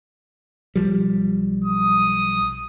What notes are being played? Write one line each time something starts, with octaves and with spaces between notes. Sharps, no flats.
B1 F3 G3
D#6